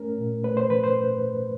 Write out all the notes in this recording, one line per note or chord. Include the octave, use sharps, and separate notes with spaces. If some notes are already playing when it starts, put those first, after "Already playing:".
Already playing: A3 C#4 A#4
A#2
A3 B4
C5
F3 B4
C5